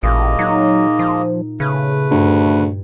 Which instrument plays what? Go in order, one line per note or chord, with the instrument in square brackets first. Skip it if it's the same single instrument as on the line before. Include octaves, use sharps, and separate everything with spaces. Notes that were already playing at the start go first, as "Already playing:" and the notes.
[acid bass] A1 [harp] A#2 [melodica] G#3 A#3 D#5
[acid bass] F#3 [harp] D#4
[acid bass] F3
[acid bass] C#3 [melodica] A3 B4
[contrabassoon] D2 [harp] G2 G#6 C#7